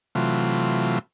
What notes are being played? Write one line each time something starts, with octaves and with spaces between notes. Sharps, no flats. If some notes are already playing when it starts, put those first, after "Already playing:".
C3 E3 F#3 A3 F4